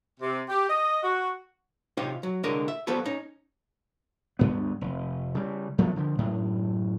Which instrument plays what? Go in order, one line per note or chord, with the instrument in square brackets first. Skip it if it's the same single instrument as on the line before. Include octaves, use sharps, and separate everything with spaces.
[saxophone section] C3
G4
D#5
F#4
[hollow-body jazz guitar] C3 D#4 F4 G4 C#5 D#5
F#3
C2 D3 G#3 A#4 C#5 D#5
E5
F3 G3 B3 A4 B4 C#5
C#4 D#4
[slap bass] D2 G2 B3
F1
C#3 G3
F#2 F3 A3 B3
D3 F3
F#2 A2